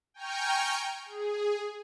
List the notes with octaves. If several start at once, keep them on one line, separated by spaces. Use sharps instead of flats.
G5 G#5 A#5 C#6 F6 G6
G#4